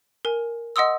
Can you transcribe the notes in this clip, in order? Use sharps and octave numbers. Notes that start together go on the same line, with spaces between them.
A#4 G#5
D#5 F#5 C6 D#6 E6